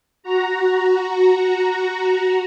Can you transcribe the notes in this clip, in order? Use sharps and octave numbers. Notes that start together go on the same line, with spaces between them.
F#4 A#5